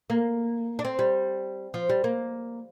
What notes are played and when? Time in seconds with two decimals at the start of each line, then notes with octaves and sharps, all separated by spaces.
0.10 A#3
0.79 D4
0.85 C4
0.99 G3
1.74 F3
1.90 G3
2.04 A#3